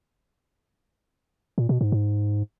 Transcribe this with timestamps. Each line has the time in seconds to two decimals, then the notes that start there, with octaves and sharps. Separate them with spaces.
1.58 A#2
1.69 B2
1.81 G#2
1.92 G#2